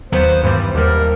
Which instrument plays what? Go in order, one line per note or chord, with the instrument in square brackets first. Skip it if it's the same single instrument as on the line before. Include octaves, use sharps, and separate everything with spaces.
[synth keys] D#2 D#3 F#3 B3 [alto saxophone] C5
[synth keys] G2 E3 G3 [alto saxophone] C5
[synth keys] D#2 D3 G3 [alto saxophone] A#4